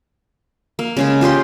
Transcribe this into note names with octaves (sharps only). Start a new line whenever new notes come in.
A#3
C#3 G#3 G#4
F4 G4 D#5 C6